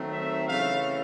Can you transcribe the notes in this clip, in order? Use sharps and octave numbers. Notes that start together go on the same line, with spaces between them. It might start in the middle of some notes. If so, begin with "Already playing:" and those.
Already playing: D#3 F#3 A3 C4
E5
C#3 E3 A3 C#4 F5